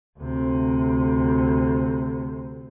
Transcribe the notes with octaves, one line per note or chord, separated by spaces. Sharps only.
D2 C3